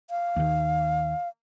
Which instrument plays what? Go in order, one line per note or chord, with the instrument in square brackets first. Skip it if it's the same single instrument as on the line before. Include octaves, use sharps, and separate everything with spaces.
[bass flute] F5
[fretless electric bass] D#2 D#3